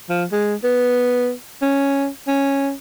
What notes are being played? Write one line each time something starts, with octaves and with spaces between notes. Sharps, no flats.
F3
G#3
B3
C#4
C#4